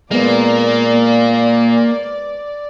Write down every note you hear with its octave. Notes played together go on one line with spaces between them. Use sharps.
A#2 G#3 A#3 B3 D5